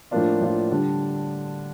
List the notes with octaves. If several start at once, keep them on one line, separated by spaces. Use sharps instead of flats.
A2 F3 A#3 D4 F4
A2 F3 A#3 D4 F4
D3 G3 D4